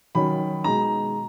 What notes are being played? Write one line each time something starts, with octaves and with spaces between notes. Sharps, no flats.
D#3 F#3 C#4 B5
B2 G#3 D#4 A#5